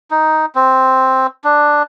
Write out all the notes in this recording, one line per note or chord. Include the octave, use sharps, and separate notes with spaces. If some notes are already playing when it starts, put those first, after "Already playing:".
D#4
C4
D4